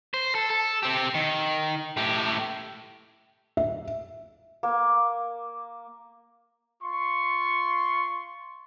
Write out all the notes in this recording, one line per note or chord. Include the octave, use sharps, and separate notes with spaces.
C5
A4
A4
C4 G4
D#3
A2 G4
E5
A#3
F4 C6 C#6